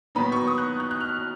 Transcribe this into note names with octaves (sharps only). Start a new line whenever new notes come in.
D#3 F#3 B3 D#4 B5
C#6
D#6
F#6
F#6
F#6
F6